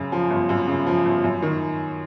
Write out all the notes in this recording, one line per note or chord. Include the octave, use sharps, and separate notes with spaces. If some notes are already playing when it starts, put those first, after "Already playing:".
Already playing: F#2 C#3
F3
G1
F#2
C#3
F3
G1
F#2
D#3